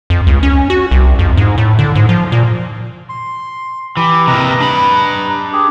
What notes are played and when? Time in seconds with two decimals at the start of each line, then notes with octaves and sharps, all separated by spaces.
0.10 F2
0.27 C#2
0.43 C#4
0.70 F#4
0.91 C2
1.19 F2
1.37 G#2
1.58 A2
1.79 D3
1.95 G#2
2.09 F3
2.32 A#2
3.09 C6
3.97 E3 G4 B5
4.27 C3 A#3 B4 D#5 A#5
4.61 D4 B5
5.53 G4 G#4